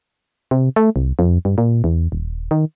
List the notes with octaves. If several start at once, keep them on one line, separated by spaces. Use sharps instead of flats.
C3
A3
C2
F2
G2
A#2
E2
D#1
D#3